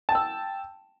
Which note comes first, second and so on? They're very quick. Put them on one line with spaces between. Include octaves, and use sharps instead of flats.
A5 G5 E6